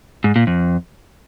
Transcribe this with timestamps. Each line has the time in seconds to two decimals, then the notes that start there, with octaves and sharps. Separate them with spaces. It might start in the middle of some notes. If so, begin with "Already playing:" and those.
0.24 G#2
0.36 A#2
0.47 F2